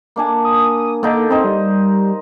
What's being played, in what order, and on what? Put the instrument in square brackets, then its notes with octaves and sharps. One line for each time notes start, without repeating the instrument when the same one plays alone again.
[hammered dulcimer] A#3 D4 G#5
[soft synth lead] D#6
[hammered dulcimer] D3 D#4 D6 [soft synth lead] A#3
[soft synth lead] C4 [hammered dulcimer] D#4 C5
[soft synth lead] G3